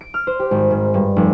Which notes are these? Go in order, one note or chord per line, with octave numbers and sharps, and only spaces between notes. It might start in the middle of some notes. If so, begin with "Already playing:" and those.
D7
F6
C5
G4
G#1
G#2
G2
F1